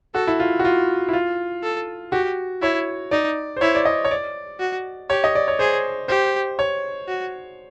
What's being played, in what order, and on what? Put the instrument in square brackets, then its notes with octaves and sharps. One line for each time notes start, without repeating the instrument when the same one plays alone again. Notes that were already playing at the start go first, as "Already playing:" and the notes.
[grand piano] F#4 [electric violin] A4
[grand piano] E4
F4
F#4
F4
E4
F4
[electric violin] A4
[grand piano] F#4 [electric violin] G4
[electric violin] E4 [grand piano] C#5
[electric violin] D#4 [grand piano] D5
[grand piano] C5
[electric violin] E4 [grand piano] C#5
[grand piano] D5
D#5
C#5
D5
[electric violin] F#4
[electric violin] G4 [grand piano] C#5
[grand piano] D#5
D5
C#5
[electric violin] G#4 [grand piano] C5
[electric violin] G4 [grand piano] C5
[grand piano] C#5
[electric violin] F#4